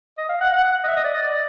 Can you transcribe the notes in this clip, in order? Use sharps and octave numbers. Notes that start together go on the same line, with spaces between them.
D#5
F5
F#5
F#5
D#5
E5
D#5
D5
D#5
D5